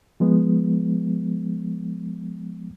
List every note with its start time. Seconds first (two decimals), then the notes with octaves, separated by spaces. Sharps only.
0.20 F3 G#3 B3